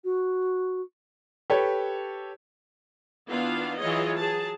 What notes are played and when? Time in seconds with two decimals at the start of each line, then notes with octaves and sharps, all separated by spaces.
0.04 F#4
1.50 G4 A4 B4 C#5
3.28 D#3 B3 D4 E4 F4 F5
3.79 E3 F#3 F4 G#4 C#5 D#5
4.18 F#3 G#4 A5